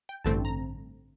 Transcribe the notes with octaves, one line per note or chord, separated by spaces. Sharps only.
G5
A1 G2 D3 A3 C4 A5
A#5